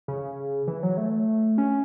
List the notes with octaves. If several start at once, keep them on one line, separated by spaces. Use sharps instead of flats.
C#3
E3
F#3
A3
C#4